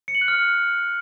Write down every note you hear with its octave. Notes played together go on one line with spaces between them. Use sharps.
C#7
F#7
F#6
F6